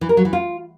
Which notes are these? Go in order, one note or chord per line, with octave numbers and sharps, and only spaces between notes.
E3
A#4
F#3
E3
F4